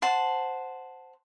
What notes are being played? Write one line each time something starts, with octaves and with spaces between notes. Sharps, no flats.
C5 F#5 A5